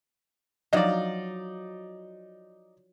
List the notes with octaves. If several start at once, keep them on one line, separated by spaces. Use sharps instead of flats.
F3 F#3 D#4 D5